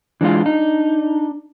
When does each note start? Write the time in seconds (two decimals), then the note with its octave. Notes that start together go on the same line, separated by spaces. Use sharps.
0.21 E3 G#3 D4 F4
0.46 D#4